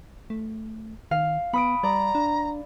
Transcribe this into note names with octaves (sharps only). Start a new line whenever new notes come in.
A3
D#3 F5
B3 B5 D#6 D7
G3 D5 A#5
D4